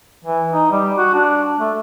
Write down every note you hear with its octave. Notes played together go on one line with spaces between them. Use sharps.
E3
D#4
G3
F#4
D4
A3